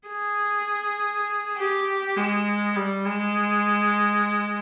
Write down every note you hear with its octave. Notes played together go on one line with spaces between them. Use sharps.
G#4
G4
G#3
G3
G#3